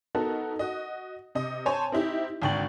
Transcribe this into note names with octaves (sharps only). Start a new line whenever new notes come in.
B3 D#4 F#4 A4 A#4
F#4 D#5
C3 D#5
C5 C#5 G#5 A5
C4 D#4 E4 G4
G#1 D2 G5 C#6 A6 F#7